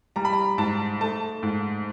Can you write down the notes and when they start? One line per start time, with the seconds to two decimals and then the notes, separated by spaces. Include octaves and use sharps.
0.16 G3 A#5
0.25 B5
0.33 A#5
0.58 G#2 A5
1.01 A3 A5
1.43 G#2